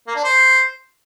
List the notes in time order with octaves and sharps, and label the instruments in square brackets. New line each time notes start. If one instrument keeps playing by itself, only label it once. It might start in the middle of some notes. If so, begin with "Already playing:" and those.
[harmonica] A#3
D4
C5